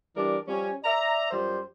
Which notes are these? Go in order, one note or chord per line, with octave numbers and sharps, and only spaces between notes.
E3 G3 D4 A#4 D5
F3 G3 C#4
D5 E5 A#5
F#2 F3 G3 C5